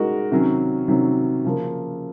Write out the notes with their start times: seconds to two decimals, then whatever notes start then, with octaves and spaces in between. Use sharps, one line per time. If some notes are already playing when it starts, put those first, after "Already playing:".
Already playing: G#3 D#4 F#4 A#4
0.32 C3 D#3 F#3 C#4
0.88 C3 D#3 F#3 C#4
1.45 C#3 F3 A#3